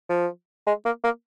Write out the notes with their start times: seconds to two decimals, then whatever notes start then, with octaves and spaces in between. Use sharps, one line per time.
0.09 F3
0.67 G#3
0.85 A#3
1.04 A#3